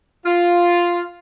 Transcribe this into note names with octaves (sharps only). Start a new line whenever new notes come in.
F4